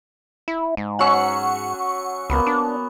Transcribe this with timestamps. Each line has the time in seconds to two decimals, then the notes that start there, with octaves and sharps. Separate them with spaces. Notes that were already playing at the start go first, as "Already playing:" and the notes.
0.48 E4
0.77 G#2
0.99 F#3 C#4 F#5 C#6 E6
2.30 C#2 A#3 B3
2.47 D4